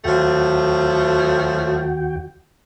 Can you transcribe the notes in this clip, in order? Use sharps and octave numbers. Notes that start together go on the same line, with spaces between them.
D#2 F3 F#3 A3 F#4 G5